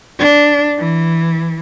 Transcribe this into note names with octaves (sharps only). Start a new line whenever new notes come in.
D4
E3